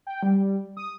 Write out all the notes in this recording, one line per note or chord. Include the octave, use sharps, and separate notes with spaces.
G5
G3
D#6